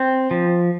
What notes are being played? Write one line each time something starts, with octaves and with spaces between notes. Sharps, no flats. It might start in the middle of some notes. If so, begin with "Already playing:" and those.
Already playing: C4
F3